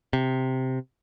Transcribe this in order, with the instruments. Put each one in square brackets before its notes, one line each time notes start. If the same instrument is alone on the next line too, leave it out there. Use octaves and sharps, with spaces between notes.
[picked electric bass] C3